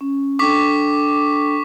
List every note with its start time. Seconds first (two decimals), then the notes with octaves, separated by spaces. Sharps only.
0.01 C#4
0.39 D4 A4 G5 C#6 D6 B6